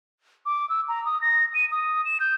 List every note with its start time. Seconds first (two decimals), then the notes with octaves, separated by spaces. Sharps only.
0.46 D6
0.69 E6
0.88 A#5
1.05 D#6
1.21 A#6
1.54 D#7
1.72 D#6
2.05 E7
2.20 G6